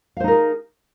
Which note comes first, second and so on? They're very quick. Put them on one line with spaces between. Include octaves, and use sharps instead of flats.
F5 C5 D#4 A#4 G#4